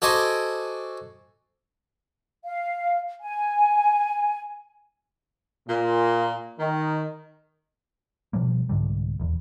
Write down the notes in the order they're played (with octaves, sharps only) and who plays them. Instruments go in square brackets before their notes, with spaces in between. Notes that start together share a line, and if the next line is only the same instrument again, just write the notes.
[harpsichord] F#4 A4 C5 D#5 G#5 D6
[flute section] F5
G#5
[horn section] A#2
D#3
[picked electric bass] B2 F3 G3 A#3
C2 G#2 D3 G3
D#1 E2